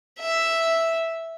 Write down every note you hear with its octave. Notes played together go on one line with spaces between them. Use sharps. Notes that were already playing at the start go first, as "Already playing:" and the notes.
E5